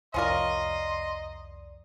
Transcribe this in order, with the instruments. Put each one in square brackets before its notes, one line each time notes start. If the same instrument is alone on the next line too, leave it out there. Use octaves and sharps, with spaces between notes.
[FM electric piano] C2 F2 D5 [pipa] C#4 F4 A#4 [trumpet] D#5 [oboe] C6